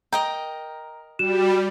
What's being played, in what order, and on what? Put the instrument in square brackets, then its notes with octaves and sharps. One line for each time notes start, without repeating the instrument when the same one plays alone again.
[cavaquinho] A#4 D#5 G5 [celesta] A#5
[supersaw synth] G3 [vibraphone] F#4 [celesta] E7